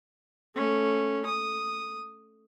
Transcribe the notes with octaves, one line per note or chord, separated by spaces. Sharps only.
A3 C#4
D#6